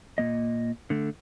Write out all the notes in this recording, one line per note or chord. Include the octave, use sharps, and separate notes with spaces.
A#2 A#3 D#5
D3 A3